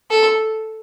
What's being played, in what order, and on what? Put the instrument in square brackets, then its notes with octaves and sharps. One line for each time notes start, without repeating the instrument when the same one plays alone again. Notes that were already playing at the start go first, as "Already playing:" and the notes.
[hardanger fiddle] A4